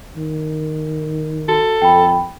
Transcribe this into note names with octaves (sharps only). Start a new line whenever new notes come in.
D#3
F#4 A4
F2 G5 B5